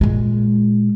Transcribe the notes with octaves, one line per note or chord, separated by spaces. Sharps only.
A#2 G#3